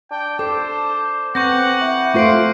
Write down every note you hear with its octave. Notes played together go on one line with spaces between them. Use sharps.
D4 G5
A4 C5 D6
B3 C4 F#5 C#6 G6 A#6
E4
A3 F4 C5 F#5 C#6 C7 D7